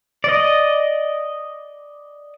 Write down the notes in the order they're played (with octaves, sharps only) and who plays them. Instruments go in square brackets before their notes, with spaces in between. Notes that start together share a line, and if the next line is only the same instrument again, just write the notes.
[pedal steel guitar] D5 D#5